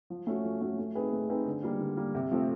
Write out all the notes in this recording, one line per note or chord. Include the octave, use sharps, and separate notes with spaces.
F3
A3 C#4 F#4
F3
A3 C#4 F#4
A3
C4 D#4 G#4 B4
A3
C4 D#4 G#4 B4
D3
G3 A#3
D3
G3 A#3
C3
F3 A3 C4